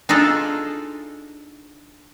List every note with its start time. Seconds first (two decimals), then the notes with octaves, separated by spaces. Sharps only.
0.09 D4 D#4 F4 G#4 A4